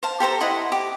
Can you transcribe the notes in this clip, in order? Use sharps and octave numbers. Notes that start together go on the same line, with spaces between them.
C5 F5 A5
G4 A4 C5 A#5
E4 D#5 F#5 C6
G4